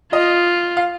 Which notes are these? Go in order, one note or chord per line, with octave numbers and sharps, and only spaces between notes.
F4 D#5
F5